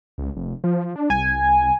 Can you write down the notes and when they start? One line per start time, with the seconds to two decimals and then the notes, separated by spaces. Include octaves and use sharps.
0.18 C#2
0.36 F1
0.64 F3
0.96 D4
1.10 C2 G#5